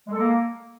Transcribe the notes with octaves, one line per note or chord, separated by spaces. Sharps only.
G#3
A4
A#3